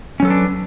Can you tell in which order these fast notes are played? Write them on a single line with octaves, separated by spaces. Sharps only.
C#4 F#3 A4 B4 D4